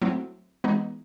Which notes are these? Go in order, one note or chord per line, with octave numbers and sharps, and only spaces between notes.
F#3 A3 C4 E4
E3 G#3 B3 D#4